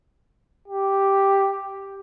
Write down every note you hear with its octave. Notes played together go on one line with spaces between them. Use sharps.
G4